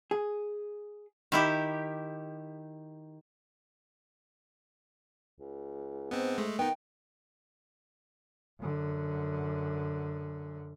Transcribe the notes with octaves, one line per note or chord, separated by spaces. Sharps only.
G#4
D#3 E4 G4
C#2
G#2 B3 C4
G#3 A3
D#3 B3 D#4 G5
F#2 D3